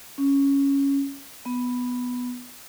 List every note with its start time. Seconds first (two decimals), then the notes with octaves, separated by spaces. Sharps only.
0.18 C#4
1.46 B3